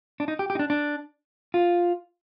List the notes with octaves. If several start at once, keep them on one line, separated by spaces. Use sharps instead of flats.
D4
D#4
G4
G4
D#4
D4
D4
F4